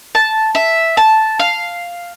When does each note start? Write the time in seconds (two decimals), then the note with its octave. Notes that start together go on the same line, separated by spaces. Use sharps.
0.15 A5
0.55 E5
0.97 A5
1.39 F5